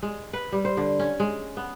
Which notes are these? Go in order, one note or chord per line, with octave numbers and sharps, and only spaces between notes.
G#3
B4
G3
C5
D3
C#4
G#3
B3